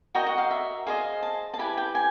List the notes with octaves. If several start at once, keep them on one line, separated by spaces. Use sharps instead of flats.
F#4 A#4 D#5 G5
F#5
F5
E5
G#4 C5 D#5 F5
A5
A5
E4 G4 B4 G#5
G5
G#5